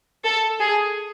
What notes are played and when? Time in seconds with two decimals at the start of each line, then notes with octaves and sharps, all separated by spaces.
0.25 A4
0.60 G#4